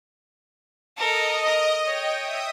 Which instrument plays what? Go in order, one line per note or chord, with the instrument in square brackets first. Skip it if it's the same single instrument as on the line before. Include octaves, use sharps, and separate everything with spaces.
[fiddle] A4 A#4 [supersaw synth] D#5
[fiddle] A#4
[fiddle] C#5 [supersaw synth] G5
[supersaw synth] E5 D#6